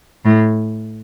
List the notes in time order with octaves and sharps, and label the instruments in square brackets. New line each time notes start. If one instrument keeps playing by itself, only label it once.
[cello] A2